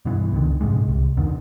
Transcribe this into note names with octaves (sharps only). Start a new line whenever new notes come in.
G2 B2 E3
C#2 D3 D#3
A#1 G#2 C3 G#3
C2
E2 D3 D#3